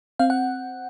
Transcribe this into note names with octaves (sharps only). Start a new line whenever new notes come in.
C4 F5
F#5